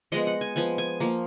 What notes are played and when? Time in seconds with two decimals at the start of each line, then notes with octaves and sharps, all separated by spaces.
0.12 F3 G#3 B3 D#5
0.27 F#5
0.41 G#5
0.56 F3 B3 G#5
0.78 G#5
1.00 F3 A#3